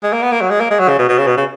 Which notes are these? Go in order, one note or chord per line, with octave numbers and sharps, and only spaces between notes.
G#3
A#3
B3
A#3
F#3
G#3
A#3
G#3
F#3
C#3
B2
B2
C#3
B2
C#3